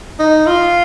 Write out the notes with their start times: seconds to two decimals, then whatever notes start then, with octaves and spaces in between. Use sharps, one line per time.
0.19 D#4
0.47 F4